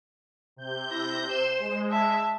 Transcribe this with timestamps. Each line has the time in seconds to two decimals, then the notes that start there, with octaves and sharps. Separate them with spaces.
0.56 C3 G6
0.88 E4 A#6
1.28 C5 E7
1.59 G#3
1.89 E5 A5